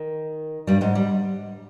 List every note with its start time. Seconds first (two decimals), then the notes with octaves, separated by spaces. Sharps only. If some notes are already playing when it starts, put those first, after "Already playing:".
Already playing: D#3
0.67 G2 G3
0.81 G#2 G#3
0.95 G3